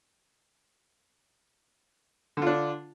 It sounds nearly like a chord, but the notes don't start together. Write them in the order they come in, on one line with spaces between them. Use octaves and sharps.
D3 F4 D4